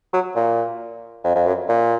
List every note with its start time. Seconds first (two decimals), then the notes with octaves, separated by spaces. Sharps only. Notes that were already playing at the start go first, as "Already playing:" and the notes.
0.13 F#3
0.35 A#2
1.24 F2
1.35 F2
1.46 F#2
1.69 A#2